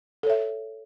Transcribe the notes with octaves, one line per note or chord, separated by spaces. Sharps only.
A4 C#5 E5